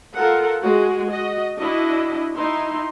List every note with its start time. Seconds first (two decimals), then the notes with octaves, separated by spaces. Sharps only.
0.16 F4 A4 A#4 F#5
0.63 G#3 F#4 G#4
1.10 F#4 D#5
1.59 D4 E4 F#4 D#5
2.35 D#4 E4 C6